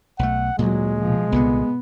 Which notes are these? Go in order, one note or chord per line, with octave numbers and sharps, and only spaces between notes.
B1 A3 F#5
D2 A#2 F#3 G#3
B2 F3
C2 A#2 D3 B3